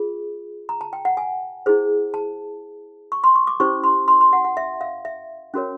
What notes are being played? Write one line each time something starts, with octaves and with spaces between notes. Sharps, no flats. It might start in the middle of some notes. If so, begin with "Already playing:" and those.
Already playing: F4 G#4
A#5
A5
G5
F#5
G#5
E4 G#4 C5
A5
C#6
C6
C#6
D6
C#4 E4 G4 C5 C#6
C6
C6
C6
F#5
F#5
E5
F5
E5
C#4 F#4 A#4 C#5